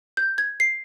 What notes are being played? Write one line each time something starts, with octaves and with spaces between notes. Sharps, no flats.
G6
G#6
C7